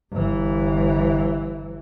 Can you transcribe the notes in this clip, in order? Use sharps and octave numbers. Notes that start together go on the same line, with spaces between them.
G1 E3